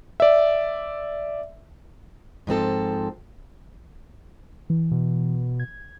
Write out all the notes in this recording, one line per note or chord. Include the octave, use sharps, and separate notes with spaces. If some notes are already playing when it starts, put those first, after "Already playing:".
D5 E5
G#2 F3 C4 A4
E3
B2
G#6